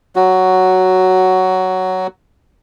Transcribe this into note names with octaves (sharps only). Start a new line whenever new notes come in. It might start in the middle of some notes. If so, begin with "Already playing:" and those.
F#3 F#4